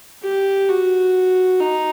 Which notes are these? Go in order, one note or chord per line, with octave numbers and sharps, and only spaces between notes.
G4
F#4
D#4